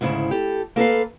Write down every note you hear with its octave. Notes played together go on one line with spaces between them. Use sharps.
D2 G#2 C#3 E4
G4 A4
A#3 A4 B4 F5